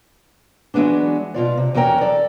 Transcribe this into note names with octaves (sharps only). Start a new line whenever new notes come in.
E3 F#3 G#3 B3 D4
B2 F4 D5
C3
E2 F#3 C#4 A#4 G5
A4 D5